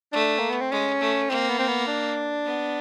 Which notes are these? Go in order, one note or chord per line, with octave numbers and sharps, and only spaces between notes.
A3 D4
A#3
B3
C4
G#3 C#4
A3
A#3 C4
B3
C4
B3
D4
B3